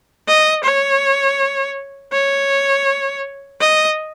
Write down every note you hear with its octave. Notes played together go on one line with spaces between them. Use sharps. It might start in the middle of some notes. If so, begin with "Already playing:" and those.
D#5
C#5
C#5
D#5